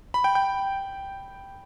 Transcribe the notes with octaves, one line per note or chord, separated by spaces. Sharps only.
B5
G5
G5